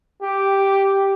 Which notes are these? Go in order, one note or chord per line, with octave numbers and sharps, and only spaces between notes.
G4